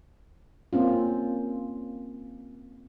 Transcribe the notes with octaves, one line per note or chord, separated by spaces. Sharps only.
A#3 C4 C#4 F4